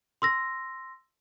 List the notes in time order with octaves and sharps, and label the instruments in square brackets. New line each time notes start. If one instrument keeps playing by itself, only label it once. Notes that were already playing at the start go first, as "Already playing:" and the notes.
[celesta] C6 E6 A#6